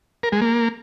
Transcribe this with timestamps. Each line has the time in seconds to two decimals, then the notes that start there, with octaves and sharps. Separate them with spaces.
0.23 A#4
0.32 G#3
0.41 A#3